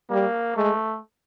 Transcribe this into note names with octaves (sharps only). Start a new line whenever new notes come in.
G3 A#3
G#3 A3